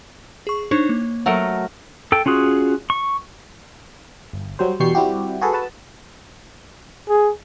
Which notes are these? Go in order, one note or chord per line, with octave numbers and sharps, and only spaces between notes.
G#4 C#6
D4 D#4 C5 C#5
A#3
F#3 A3 A#4
A4 G5
C#4 F4 F#4 G#4
C#6
G1
F#3 G3 C5
E2 B2 G3 C#6 G6 C7
G3 C4 E4 F#4 G4
F#4 G#4 A4 B4
F#4 B4 A5
G#4